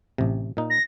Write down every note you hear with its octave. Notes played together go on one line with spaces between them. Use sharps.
A1 C3
A#2 D#4
A#6